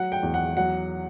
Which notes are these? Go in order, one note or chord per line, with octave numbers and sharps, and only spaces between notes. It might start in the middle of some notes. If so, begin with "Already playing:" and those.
Already playing: F#3 F#5
G5
E2
F#5
F#3 F#5